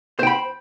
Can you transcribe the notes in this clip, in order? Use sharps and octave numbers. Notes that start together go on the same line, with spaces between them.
C5 G5 B5